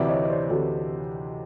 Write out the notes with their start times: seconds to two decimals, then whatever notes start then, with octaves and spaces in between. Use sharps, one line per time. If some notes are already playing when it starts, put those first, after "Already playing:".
Already playing: D2 C3 E3 D5 E5
0.08 C#5 D#5
0.24 D#5
0.30 C5 D5
0.50 D2 C3 E3 A4